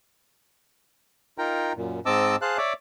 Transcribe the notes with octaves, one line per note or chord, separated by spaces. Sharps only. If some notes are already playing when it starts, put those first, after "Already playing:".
D#4 F4 A#4 G5 A#5
F#2 A#2
G#2 C4 D#5 A5 D6 E6
G#4 C5 F5 A5 F#6
C#5 D5 E5 D6